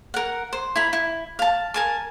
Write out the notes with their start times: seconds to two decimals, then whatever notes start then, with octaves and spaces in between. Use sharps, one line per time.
0.14 A#4 F#5
0.53 C5
0.76 E4 A#5 B5
0.93 E4
1.39 F5 A5
1.74 A#4 G#5 A5